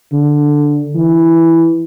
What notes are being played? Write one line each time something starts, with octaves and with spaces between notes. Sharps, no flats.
D3
E3